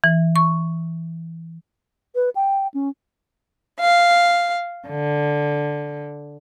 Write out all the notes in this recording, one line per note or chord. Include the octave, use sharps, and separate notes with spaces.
E3
C#6
B4
G5
C#4
F5
D3